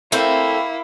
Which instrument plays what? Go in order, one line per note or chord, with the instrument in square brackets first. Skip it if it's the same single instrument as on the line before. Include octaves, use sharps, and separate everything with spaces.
[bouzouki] A3 C4 [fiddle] A#3 [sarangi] E4